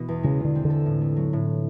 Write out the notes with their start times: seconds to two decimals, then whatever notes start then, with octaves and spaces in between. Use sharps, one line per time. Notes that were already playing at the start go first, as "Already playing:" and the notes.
Already playing: B2 E3 B3
0.08 E2
0.23 C#3 G#3
0.39 F4
0.45 D3
0.55 C4
0.65 D3
0.70 A4
0.86 A2
1.01 A3
1.17 F#3
1.33 A2